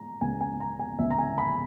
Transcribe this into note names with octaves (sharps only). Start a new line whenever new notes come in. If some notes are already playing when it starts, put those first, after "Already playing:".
Already playing: G#3 A#5
C#2 C#3 G#3 B3 G#5
G#5
A#5
G#5
C#2 C#3 G#3 B3 E5
A#5
G#5
B5